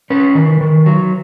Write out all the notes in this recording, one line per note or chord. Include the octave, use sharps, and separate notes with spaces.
C#4 B4
D#3
D#3
F#3